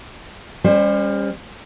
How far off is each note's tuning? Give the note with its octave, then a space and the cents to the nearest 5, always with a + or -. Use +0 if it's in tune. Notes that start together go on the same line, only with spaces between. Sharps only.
G3 +35 C#4 +0 C5 +5